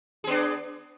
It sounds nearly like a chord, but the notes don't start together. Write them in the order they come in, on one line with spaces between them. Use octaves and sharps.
G#4 B3 D4